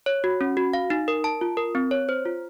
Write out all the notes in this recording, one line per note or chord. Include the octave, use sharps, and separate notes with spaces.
C#5
F#4
C#4
F#4
F5
D#4
A#4
A5
F4
A#4
C4
C#5
C5
F4